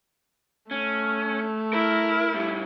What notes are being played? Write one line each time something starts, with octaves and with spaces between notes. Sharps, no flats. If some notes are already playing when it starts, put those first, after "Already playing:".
A3 C#4
E4 A#4
A2 G3